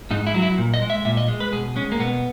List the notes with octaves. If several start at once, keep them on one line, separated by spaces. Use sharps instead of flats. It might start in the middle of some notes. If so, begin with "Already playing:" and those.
G#2 D#4
E4
F#3
E4
A#2
D#5
G#3
E5
A#2 E5
D#5
G#3
B4
B2 G#4
G#3 C#4
A#3
B2 B3